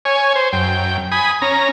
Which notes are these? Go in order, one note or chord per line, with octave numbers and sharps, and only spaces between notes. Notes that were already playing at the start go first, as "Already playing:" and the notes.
C#5 G#5
C5
F#2 G5
G#5 B5 D#6
C#4 A#5